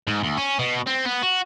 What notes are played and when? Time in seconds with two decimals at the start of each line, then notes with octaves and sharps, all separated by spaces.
0.07 G#2
0.24 D2
0.37 C#4
0.59 B2
0.87 C4
1.05 B3
1.23 F#4